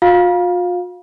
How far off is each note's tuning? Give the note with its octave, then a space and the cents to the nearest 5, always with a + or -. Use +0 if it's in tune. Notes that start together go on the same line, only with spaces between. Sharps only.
F4 +45 F5 +10